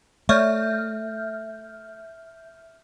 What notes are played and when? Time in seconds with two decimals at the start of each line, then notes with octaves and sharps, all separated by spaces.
0.29 A3 C#5 D5 E5 C#6 F6 G6